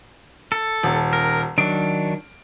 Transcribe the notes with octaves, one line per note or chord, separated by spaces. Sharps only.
A4
D#1
A#4
D#3 F#3 D4 D7